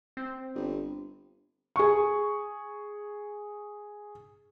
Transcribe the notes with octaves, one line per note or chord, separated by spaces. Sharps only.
C4
G1
G#4 C#6